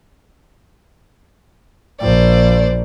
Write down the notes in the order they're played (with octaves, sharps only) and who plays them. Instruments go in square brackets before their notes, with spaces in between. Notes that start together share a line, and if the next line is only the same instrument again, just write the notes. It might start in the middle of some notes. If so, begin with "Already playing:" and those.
[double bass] A#1 [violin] C5 D5